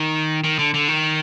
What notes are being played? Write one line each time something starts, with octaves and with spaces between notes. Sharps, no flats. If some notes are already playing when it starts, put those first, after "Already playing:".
Already playing: D#3
D#3
D3
D3
D#3